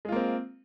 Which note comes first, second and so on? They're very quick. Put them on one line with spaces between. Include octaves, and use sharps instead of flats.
G#3 F4 A#3 C4